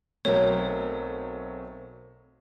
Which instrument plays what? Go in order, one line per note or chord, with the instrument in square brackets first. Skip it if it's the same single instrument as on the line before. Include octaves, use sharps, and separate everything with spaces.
[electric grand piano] B1 F#3 A3 [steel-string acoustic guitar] C4 A#4 [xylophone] C#5